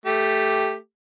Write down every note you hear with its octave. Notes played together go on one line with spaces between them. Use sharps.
A3 G4